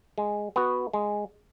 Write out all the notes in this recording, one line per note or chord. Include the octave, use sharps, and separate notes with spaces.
G#3
B3 F#4
G#3